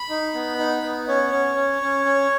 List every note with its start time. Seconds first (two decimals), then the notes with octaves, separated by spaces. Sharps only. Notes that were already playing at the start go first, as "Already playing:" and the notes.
Already playing: B5
0.10 D#4
0.34 B3
0.58 D#4
0.83 B3
1.08 C#4 C#5
1.32 C#4
1.56 C#4
1.82 C#4
2.05 C#4